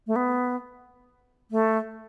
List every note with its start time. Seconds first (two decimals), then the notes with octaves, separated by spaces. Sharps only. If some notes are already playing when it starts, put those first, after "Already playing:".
0.07 A3
0.16 B3
1.51 A3